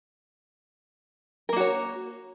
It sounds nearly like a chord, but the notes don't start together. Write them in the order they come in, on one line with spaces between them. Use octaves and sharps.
A#4 A#3 F#4 C#5